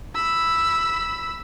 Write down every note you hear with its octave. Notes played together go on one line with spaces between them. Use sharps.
B5 E6